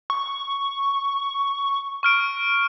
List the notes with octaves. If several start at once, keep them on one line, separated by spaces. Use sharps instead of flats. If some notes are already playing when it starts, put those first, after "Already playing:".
C#6
C#6 F6 D7